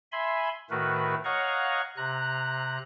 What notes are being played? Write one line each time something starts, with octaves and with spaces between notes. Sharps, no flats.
E5 G#5 B5 C6
A2 D#3 A3 F#4 A#4 B4
C#5 D#5 F5 F#5 A#5 C#6
C3 A#5 F#6